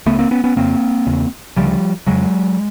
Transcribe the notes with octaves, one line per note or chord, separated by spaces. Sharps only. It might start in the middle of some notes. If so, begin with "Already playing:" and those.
C#2 C#3 A3 B3
A#3 C4
B3 C#4
B3 C#4
F2 C#3 A#3 C4
E2 C#3
D2 C#3 F3 G3
F2 C#3 F#3 G#3